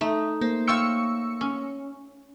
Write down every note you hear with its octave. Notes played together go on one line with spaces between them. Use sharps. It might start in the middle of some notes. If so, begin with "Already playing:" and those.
A3 D#4
A#3 C5
F4 C#5 G5 C#6 E6 C#7
C#4